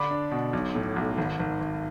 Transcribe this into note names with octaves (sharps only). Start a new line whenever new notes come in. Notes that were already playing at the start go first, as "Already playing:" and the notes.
Already playing: D3 D4 B5 D6
D4
B2
B1
A2
B1
G#1
G#1
G#1